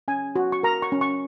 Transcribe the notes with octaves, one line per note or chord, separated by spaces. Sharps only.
C#4 G#5
F#4
C#6
A#4 A#5
C#6
C#4
C#6